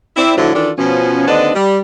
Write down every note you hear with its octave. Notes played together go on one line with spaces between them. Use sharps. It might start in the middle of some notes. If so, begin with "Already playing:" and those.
C4 E4 D5
A2 D3 F3 F#3 E4
D#3 E3 D4 F4 A4 D5
B2 F3 C#4
D#2 D3 C4 D4 B4 D#5
G3